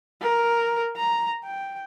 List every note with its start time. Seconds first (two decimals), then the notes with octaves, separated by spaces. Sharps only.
0.22 A#4
0.97 A#5
1.45 G5